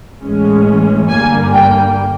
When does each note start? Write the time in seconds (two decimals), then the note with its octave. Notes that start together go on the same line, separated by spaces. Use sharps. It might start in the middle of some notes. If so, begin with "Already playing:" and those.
0.23 A2 E3 G#3 C#4
1.09 G1 G2 D3 G3 A#3 G#5
1.52 G5